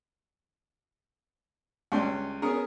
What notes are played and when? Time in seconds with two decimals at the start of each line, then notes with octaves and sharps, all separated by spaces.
1.92 C#2 G2 C#4 C6
2.42 B3 C#4 G#4 A#4